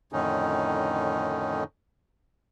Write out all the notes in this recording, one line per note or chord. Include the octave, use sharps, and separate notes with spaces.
F2 A2 D3 D#3 C#4 D#4